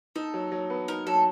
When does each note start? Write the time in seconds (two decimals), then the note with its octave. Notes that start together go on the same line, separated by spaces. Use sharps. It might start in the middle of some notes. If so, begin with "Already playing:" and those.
0.16 D#4 A4
0.34 F#3
0.52 F#3
0.70 B3
0.88 D#4 A#4
1.07 F#3 A4